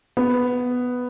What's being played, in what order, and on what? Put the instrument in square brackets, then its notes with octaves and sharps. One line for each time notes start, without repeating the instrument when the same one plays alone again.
[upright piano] B3